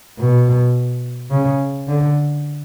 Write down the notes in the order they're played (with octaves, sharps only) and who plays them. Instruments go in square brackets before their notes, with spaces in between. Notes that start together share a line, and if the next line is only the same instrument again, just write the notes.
[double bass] B2
C#3
D3